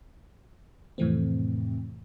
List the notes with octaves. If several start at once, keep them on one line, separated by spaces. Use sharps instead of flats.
F2 A2 C3 E3 A3 C4